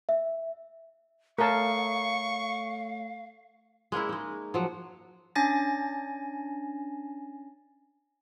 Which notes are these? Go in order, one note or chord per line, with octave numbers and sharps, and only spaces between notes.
E5
A3 A4 A#4 C#5 F5 A5 C#6
G#3 A#3 C#4 E4
G#3 D#4
F3 F#3
C#4 D4 G#5 A6 A#6